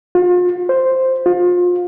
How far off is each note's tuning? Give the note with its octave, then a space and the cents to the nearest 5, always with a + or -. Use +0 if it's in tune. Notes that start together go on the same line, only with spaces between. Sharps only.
F4 +40
C5 +0
F4 +30